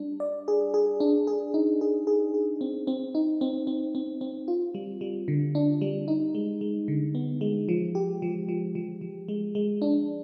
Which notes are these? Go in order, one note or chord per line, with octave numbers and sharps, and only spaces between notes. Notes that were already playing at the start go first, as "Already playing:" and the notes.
Already playing: G3 D4
D5
G#4
G#4
D4
G#4
D#4
G#4
G#4
G#4
C4
C4
D#4
C4
C4
C4
C4
F4
G3
G3
D3
D4
G3
D#4
G#3
G#3
D3
B3
G#3
F3
G4
F3
F3
F3
F3
G#3
G#3
D4